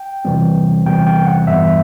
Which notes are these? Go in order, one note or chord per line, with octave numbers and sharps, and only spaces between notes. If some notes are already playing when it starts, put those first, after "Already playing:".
Already playing: G5
E2 C3 E3 G3 C4
E2 C3 E3 G3 C4 G5
G5
F#5
G2 E3 G3 B3 E5